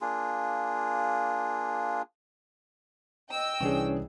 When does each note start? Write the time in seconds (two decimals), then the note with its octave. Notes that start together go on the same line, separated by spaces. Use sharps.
0.01 A#3 D4 F4 G#4
3.30 D#5 G5 E6
3.60 C2 E3 C#4 D4 G#4 C#5